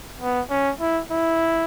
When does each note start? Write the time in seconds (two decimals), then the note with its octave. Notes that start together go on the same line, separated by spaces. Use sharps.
0.20 B3
0.50 C#4
0.80 E4
1.11 E4